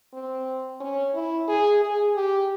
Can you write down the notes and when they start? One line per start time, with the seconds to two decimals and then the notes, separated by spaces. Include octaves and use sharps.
0.13 C4
0.80 C#4
1.14 E4
1.48 G#4
1.82 G#4
2.16 G4